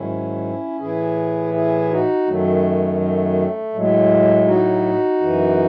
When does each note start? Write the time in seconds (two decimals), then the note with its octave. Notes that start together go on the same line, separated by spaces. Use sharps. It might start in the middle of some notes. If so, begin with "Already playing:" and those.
Already playing: G#2 D#3 F#3 C#4 E4
0.80 A2 E3 E4 G#4
1.54 E4 G#4
1.90 D#4 F#4
2.27 F#2 D#3 F#3 A3
3.00 A3
3.74 A2 F#3 G#3
4.47 D#4 F#4
5.20 F#2 E3